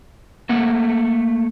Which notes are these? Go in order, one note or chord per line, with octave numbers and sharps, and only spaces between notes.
A3 A#3 A4 F#5